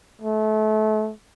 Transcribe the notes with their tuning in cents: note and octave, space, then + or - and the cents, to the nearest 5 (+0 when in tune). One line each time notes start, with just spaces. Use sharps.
A3 -30